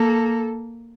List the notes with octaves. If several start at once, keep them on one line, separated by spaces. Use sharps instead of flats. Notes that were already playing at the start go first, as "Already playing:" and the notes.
Already playing: A#3 A4